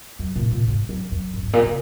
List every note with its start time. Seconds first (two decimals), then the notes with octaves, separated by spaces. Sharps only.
0.19 F#2
0.36 A#2
0.51 A#2
0.68 G#2
0.89 F#2
1.12 F#2
1.34 A#2
1.43 G#2
1.53 A#2
1.66 C#3